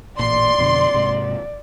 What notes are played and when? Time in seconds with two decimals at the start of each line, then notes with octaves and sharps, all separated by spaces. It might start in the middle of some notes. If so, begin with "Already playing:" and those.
0.19 A1 A#2 D5 C6
0.58 F2 B2 D3
0.94 G#2 C3